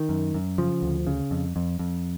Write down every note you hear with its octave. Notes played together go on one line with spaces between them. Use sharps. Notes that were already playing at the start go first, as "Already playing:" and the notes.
Already playing: D#3
F#2
F#2
C#3 F3
D2
C#3
F2
F2
F2